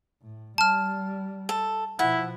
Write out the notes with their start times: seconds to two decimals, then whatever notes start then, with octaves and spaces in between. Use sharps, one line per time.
0.22 A2
0.58 G3 A5 F6
1.49 A4
1.99 B2 F3 E4 F#5